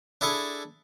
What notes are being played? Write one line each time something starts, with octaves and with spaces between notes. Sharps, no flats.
D4 E4 G#4 A4